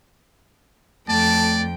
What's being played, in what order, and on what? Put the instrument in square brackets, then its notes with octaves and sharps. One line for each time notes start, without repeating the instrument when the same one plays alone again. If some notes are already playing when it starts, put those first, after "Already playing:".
[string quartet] F2 G5 [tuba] A3 [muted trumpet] D5 [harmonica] A5